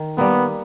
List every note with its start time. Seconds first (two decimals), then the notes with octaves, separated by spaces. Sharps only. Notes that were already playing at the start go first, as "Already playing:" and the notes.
Already playing: D#3
0.18 G3 A#3 B3